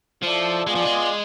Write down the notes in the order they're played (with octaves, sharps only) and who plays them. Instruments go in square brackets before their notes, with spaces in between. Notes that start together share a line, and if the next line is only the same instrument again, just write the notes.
[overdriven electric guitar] F3 [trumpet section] E4 A4 D5
[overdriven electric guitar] G#3 [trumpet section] B3 F4 G#4 D5
[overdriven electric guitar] F3
G#3